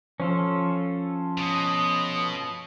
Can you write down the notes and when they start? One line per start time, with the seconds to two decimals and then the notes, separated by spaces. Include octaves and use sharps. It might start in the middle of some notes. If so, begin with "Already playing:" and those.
0.20 F3 C#4 F4 A4
1.38 B2 D#6